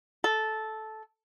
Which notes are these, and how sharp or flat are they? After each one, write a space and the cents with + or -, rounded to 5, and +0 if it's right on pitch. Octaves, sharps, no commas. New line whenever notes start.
A4 -10